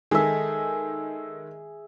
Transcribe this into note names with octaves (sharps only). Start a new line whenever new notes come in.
D#3 G#3 G#4 A4 E5